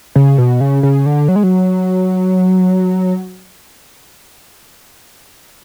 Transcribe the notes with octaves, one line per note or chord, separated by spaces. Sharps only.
C#3
B2
C#3
C#3
D3
F#3
G#3
F#3